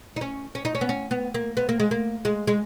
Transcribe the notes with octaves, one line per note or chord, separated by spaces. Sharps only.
D#4
C#4
C#4
D#4
C#4
B3
C#4
B3
A#3
B3
A#3
G#3
A#3
G#3
G#3